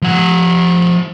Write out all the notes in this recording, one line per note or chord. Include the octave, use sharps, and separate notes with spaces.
F3 F#5